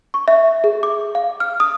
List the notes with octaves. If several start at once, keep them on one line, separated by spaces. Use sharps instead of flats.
C#6
E5
G#4
D6
F5
F6
D#6